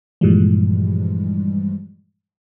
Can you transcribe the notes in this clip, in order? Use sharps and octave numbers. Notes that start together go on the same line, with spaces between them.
G2 A#2 E3 F3 G3 G#3